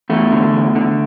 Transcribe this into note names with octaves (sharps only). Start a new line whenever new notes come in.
E2 A3
D3
E2
D3